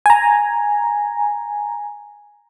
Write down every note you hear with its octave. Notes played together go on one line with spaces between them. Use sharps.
G#5 A#5